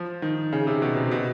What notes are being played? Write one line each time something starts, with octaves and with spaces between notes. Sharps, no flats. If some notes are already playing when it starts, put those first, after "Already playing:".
Already playing: F3
D#3
C#3
C3
B2
C3
B2